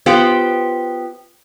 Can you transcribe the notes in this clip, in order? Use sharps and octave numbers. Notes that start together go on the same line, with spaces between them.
B3 F4 G4 C5